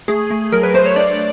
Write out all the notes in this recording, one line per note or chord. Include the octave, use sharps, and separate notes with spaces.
A3 G#4
A3
F#3 A#4
B4
A3 C5
C#5
D4 D5